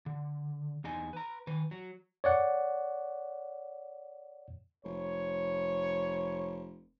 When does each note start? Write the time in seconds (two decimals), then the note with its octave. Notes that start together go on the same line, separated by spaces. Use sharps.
0.06 D3
0.84 E2 D#4 D#5 G#5
1.13 B4 A#5
1.47 D#3 B4
1.71 F#3
2.24 C#5 D5 F#5
4.84 F1 C#5